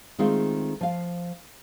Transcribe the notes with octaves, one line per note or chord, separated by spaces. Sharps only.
D#3 G#3 A3 C4 F4
F3 F5